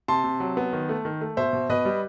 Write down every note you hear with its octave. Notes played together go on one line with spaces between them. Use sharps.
C3 A5 C6
C3
F#3
B3
D#3
A3
D#3
A3
B2 C5 E5
B2
B2 B4 D#5
G3